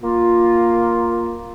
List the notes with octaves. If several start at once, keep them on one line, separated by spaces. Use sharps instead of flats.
A#3 F4